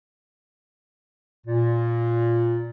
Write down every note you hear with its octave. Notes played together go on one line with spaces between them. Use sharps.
A#2